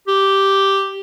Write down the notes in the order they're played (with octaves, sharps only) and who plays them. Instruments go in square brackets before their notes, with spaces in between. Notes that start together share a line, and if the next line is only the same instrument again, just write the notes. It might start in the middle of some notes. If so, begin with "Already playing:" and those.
[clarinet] G4